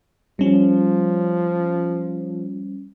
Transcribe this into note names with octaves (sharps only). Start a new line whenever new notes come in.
F3 G3 C#4